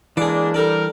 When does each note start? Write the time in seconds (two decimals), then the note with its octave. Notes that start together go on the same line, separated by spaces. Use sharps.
0.17 E3 G#3 A#3 D4 G#4 D5
0.54 G3 D4 A4 A#4